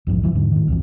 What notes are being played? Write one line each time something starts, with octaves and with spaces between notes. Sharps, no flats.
A#1 E2 G#2 F3
F#1 D2 E3 F#3
E2 G#2 D3
A2 D#3
C2 F2 E3